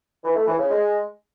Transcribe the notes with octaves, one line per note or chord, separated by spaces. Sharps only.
E3
A3
E3
C#3
G#3